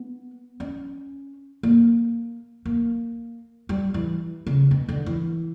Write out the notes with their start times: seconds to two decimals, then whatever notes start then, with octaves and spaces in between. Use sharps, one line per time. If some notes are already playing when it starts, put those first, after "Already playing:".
Already playing: B3
0.60 C#4
1.63 A#3
2.65 A#3
3.69 G3
3.94 E3
4.47 C#3
4.71 B2
4.89 D3
5.06 E3